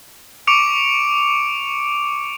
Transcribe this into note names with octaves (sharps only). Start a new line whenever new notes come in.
C#6 D6 C#7 D7 F7